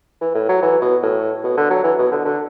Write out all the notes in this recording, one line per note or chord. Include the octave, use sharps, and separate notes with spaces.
E3
A2
F#3
E3
B2
A2
B2
D3
F#3
E3
B2
D3
D3